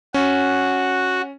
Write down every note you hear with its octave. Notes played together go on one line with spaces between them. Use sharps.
C#4 F#4